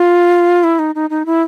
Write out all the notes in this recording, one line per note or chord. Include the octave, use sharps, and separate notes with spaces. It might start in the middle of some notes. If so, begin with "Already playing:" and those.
Already playing: F4
E4
D#4
D#4
D#4
E4